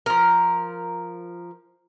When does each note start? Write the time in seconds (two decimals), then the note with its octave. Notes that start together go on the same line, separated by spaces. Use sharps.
0.06 F3 A#4